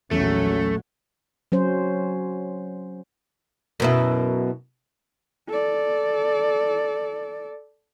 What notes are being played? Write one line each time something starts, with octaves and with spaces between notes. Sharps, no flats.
A#1 E2 F#3 A3 C#4
F#3 C#4 C5
F#2 B2 E4
A4 D5